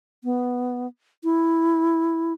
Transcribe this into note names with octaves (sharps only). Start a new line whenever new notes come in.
B3
E4